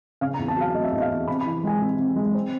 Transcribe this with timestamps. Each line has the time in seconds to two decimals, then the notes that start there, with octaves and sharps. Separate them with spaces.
0.21 C#3 F5
0.34 A#5
0.39 E2
0.48 A5
0.57 F#3 F5
0.74 A3 D#5
0.84 E5
0.92 E2 D#5
1.01 F5
1.11 E2
1.28 C3 B5
1.41 B5
1.46 E3
1.64 G#3 G#5
1.81 C3
1.99 C3
2.16 G#3
2.34 C4